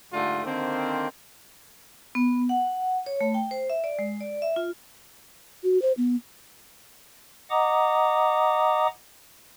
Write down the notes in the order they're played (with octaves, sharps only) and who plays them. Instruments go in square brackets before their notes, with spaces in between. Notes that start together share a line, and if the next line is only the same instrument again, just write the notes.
[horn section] G#2 D3 G3 A3 F4
D3 D#3 A#3 C4
[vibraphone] B3
F#5
C#5
A3
G5
C5
E5
D5
G#3
D5
E5
F4
[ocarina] F#4
C5
B3
[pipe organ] D#5 F#5 A#5 D6 D#6